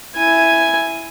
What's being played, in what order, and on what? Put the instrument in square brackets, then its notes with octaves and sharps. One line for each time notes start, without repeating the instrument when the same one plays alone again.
[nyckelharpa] E4 G#5